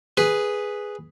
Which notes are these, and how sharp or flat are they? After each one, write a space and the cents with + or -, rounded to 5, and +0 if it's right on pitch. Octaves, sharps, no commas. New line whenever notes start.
G#4 +0 B4 +0